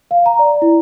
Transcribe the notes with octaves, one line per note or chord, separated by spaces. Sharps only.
F5
A#5
D5
E4